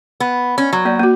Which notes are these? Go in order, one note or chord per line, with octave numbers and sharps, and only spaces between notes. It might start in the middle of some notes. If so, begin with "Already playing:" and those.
B3
C#4
F#3
A#3 D5
A#3 F#4